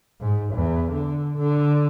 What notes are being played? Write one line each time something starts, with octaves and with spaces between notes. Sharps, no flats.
G#2
E2
D3
D3